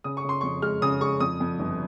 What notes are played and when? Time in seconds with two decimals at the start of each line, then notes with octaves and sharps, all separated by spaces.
0.04 C#3 D#6
0.17 C#6
0.24 C#3 C6
0.41 F2 C#6
0.62 G#3 F6
0.82 C#3 D#6
1.01 G#3 C#6
1.20 F2 D#6
1.40 F2
1.59 G1